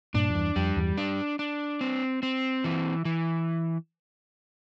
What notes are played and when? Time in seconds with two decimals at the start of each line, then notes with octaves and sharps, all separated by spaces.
0.14 G2 A#2 D4
0.29 F2
0.35 E2 G2
0.56 F2 G3
0.77 E2 G2
0.97 D4
1.39 D4
1.81 C4
2.23 C4
2.64 E3
3.05 E3